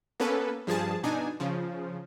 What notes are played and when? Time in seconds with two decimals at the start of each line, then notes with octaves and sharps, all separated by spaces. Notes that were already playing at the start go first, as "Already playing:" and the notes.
0.20 A#3 B3 C#4 A4 B4
0.67 G2 F3 G#4 A5
1.03 B2 D4 D#4 G#5
1.40 C#3 F3